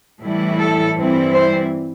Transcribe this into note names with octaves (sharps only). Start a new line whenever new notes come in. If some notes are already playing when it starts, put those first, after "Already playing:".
A2 E3 G3 E4
A4
G2 E3 G3 C4 E4
C5